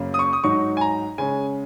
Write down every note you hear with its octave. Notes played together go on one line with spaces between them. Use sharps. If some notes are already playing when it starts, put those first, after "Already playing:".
Already playing: F#2 C#3 A#3
D#6
C#6
D#6
G#2 F#3 D#4 C#6
G#5
A#5
C#3 G#3 C#4 G#5